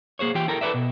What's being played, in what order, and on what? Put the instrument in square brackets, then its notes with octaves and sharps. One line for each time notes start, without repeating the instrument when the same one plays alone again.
[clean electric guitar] A#3 G#4 C5 C#5
E3 F4 G4 G5
E4 A4 A#4 G5 A#5
E4 A4 B4 D5 E5
B2